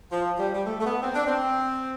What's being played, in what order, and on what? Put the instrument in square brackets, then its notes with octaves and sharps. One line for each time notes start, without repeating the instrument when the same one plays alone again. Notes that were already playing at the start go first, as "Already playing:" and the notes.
[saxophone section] F3
G3
G3
A3
A3
B3
C4
D4
C4